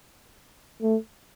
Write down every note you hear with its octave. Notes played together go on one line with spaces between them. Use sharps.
A3